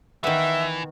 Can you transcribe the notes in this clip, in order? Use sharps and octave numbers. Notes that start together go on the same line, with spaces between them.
D#3 E3 B3 E5